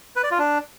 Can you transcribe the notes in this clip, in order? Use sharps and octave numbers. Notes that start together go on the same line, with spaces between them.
B4
D5
F4
D4